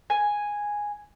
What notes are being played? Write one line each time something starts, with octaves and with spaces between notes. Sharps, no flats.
G#5